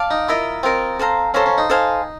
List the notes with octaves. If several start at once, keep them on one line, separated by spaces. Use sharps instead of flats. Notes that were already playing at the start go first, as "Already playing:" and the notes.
Already playing: D5 F5 A5
D#4
E4 F4 A#4 D#5
C4 F4 A#4 D#5
A4 C5 F5 A#5
C#4 A4 C5 F5 A#5
C#4
D#4
A4 C5 F5 G#5